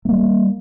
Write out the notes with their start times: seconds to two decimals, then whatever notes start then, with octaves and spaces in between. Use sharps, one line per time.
0.05 A3
0.09 A#3
0.12 G3